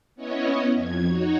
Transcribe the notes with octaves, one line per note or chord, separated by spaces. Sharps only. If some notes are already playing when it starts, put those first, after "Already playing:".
B3 C#4 E4 C#5 D#5
F2 G#6
D#4 F#4 C#5